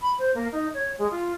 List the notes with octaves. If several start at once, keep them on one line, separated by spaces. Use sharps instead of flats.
B5
C5
A#3
D#4
C#5
G#3
F4